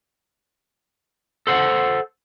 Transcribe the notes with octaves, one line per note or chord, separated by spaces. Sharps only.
A4 C5 F#5